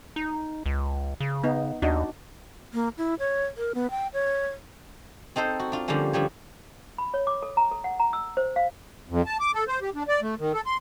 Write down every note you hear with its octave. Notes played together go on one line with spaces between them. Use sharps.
D#4
C#2
C#3
B3 D#4
D#2 D4 D#4 F#4
A#3
E4
C#5
A#4
B3
G5
C#5
C4 D#4 A4 C5
F#4
D4 F4
D3 F3 G3 A#3 C#4
D3 F3 G3 C#5
B5
C#5
D6
A4
A#5
A4
F#5
A#5
E6
C5
F5
F2
A5
D6
A4
C5
G4
D4
D5
A3
D#3
A4
C6